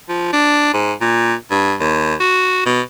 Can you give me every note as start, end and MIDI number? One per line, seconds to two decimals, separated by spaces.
0.09 0.32 53
0.33 0.69 62
0.74 0.93 44
1.01 1.34 46
1.51 1.74 43
1.80 2.14 39
2.20 2.66 66
2.66 2.81 47